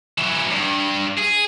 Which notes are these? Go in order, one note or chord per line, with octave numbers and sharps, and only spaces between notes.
E3 F#3
G2
G#4